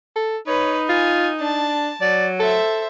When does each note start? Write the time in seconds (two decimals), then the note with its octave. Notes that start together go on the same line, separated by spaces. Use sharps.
0.16 A4
0.47 D#4 B4 C#5
0.89 F4 G#5
1.41 D4 A5
2.01 F#3 D5
2.40 A4 C5 E5